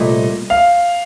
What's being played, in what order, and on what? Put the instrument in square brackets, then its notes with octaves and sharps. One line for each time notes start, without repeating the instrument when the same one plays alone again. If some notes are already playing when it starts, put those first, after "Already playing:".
Already playing: [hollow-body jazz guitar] C2 A#2 A3 [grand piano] D#5
[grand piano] F5